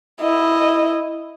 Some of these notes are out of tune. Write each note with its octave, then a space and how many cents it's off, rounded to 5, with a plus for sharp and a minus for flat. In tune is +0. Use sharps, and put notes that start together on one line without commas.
E4 -5 D#5 -5